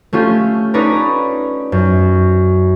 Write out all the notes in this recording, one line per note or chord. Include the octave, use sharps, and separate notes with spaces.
A3 C#4 F4 G4
C#4 D#4 B4 C#5 D5 A#5
F#2